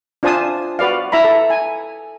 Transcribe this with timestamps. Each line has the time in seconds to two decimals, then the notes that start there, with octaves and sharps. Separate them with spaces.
0.23 D4 F4 C5 G#5 A5 D#6
0.79 F#4 B4 D5 F5
1.12 E4 E5 A#5 B5
1.24 A4
1.50 G#5